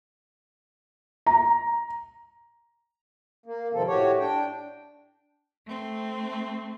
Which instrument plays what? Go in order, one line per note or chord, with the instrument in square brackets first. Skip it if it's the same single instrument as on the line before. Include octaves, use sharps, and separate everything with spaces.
[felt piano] A#5
[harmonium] A#3
G#2 C3 D#3 F3 C4 A4
A2 F#4 G4 C#5
D4 G5
[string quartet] A3 C4